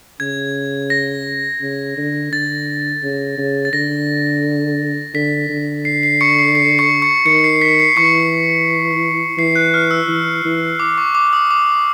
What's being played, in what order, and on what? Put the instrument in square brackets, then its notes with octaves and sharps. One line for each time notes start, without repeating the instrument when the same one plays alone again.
[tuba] C#3 [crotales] G#6
[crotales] A#6
[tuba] C#3
D3
[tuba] D3 [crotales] A6
[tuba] C#3
C#3
[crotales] A6
[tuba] D3 [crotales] A#6
[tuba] D3 [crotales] B6
[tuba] D3
[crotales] C7
C7
C#6 C#7
C7
C7
C#6 C#7
C#6 C#7
[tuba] D#3 [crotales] C#6 C#7
[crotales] C7
B6
C7
[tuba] E3 [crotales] C#6 C#7
[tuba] E3 [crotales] C7
[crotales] F#6
F6
E6
[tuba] E3
E3
[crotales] D6
C#6
D6
D#6
D6